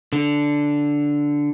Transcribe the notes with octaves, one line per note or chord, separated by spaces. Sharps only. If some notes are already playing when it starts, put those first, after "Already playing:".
D3